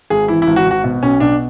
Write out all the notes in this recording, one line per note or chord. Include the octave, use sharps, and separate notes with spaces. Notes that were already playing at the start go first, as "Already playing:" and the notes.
G#1 G#4
E3 E4
E4
G#1
F#4
G#1
F#4
B2
B1 C#4
B2 D4